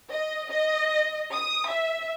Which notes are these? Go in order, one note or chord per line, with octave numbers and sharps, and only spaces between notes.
D#5
D#5
D#6
E5